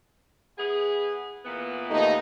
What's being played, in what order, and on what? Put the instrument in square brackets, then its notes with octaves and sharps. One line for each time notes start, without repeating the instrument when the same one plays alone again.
[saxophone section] B3 E4 G#4
A#2 E3 B3
[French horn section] D#2 A3 D#4